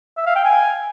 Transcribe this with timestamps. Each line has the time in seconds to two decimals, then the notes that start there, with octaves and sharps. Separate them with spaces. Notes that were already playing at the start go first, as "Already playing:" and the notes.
0.17 E5
0.26 F5
0.35 G5
0.45 G#5